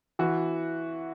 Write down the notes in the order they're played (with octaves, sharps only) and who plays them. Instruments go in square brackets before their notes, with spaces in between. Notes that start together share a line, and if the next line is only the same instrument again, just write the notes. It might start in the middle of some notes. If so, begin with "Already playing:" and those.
[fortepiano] E3 [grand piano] F#4